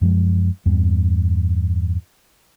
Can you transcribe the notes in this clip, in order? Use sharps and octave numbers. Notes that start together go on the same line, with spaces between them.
F#2 F3 G#3
E2 G2